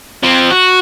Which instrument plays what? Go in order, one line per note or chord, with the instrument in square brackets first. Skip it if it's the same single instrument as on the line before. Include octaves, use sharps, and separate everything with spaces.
[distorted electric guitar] F3 C4
F#4